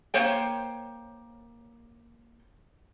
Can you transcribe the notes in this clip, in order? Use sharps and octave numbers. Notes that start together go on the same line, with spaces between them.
A#3 C5 C#5 G5